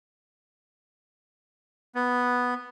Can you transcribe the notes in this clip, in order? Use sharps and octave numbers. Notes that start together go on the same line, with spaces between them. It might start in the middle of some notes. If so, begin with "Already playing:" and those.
B3